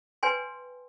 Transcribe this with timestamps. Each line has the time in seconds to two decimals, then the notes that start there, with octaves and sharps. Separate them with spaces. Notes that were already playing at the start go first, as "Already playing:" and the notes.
0.23 B4 C#5 G5 G#5 C6